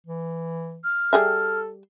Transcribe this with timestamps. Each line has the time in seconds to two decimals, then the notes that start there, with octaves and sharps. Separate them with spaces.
0.06 E3
0.84 F6
1.13 G3 G#4 A4 E5